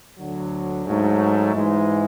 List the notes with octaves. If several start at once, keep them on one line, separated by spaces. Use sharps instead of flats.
D2 D3 F#3
G#2 F#3 A3
G#2 E3 G#3